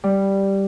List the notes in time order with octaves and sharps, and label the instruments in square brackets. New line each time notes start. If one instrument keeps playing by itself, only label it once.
[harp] G3